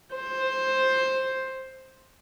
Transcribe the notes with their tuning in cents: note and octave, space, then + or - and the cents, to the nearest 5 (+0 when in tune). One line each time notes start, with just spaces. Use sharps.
C5 +10